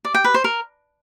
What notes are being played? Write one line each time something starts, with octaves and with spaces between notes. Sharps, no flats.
D5
G5
B4
C5
A#4